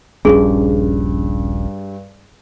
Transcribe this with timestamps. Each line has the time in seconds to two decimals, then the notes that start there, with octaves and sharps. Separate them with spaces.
0.25 D#1 A#1 G2 C#4 G#4